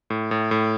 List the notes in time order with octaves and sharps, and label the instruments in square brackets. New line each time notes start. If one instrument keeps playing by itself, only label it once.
[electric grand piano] A2
A2
A2